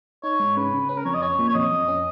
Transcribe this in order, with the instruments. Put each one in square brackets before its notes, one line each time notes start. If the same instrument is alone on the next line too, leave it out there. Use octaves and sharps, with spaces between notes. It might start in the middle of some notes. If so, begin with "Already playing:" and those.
[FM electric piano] D#4 [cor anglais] C#5
[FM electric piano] G#2
[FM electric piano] C#3 [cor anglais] B4
[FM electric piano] C#3
[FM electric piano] C#4 [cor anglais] B4
[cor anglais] A#4
[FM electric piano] F2 [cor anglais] C#5
[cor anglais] D#5
[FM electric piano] C#4 [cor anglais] C#5
[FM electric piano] A#2
[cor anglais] C#5
[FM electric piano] F2 [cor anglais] D#5
[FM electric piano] F2
C#4